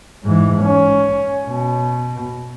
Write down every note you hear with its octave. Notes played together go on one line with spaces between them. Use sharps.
G#2 E3
C#4
B2